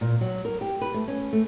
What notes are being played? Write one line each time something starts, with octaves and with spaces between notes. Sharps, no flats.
A#2
F#3
A#4
G4
B4
A3
C#4
A3